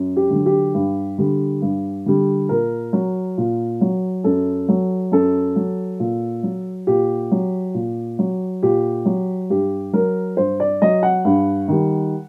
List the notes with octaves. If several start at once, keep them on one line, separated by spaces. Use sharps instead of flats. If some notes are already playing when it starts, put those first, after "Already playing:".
Already playing: F#2
G4
D3 F#3
G4
G2
D3 G3
G2
D3 G3
A#2 A#4
F#3
A#2
F#3
F#2 A4
F#3
F#2 A4
F#3
A#2
F#3
A#2 G4
F#3
A#2
F#3
A#2 G4
F#3
G2 G4
F#3 A#4
G2 C5
D5
F#3 D#5
F#5
G2
D#3 G3